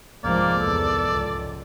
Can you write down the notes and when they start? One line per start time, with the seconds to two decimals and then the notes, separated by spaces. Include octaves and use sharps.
0.24 C2 F2 G#2 F3 G#3 A#3 D5
0.60 E2 D#3 A4
1.11 C#2